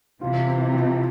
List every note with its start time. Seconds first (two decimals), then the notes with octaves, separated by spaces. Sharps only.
0.21 C3 E3 F4
0.47 C4
0.74 F3